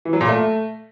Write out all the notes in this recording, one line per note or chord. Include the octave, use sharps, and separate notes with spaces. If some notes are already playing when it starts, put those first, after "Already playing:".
E3
F#3
A#2
A3